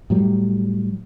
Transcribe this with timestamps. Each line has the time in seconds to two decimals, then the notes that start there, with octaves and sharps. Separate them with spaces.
0.10 A2 F#3 G3